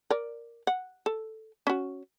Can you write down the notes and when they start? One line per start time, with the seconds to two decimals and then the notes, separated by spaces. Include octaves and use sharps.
0.10 A#4 D5
0.67 F#5
1.06 A4
1.67 C#4 F#4